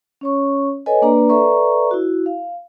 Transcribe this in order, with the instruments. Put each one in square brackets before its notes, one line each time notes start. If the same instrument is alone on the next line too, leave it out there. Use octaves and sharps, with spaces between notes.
[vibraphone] C#4 C#5 C#6
A4 B4 C#5 D#5 G#5
A#3 D4 B4 D5 A#5
A4 B4 D5 E5 A#5 C#6
E4 F#4
F5